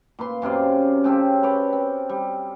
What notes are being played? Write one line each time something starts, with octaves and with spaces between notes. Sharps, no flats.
A#2 B4 C6
F#2 C3 F4 D5
C#3 C4 G4 A4
B4 C#5 D5 G5
C4
G3